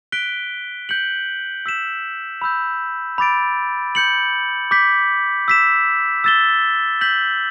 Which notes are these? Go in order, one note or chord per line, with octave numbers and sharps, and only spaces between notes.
F#6 B6 D7 G7
G6 C#7 F#7
E6 B6 E7
B5 E6 G6
B5 D6 A6 D7
G6 C#7 F#7
D6 G6 B6
E6 B6 E7
E6 A6 E7 G7
G6 B6 F#7